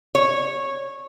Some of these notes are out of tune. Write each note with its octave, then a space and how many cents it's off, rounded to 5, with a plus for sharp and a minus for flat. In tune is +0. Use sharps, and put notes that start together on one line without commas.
C#5 -15